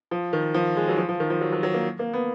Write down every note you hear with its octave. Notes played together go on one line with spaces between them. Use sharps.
F3
D#3
F3
G#3
F#3
F3
F3
D#3
F3
F#3
F#3
F#3
A#3
A#3
B3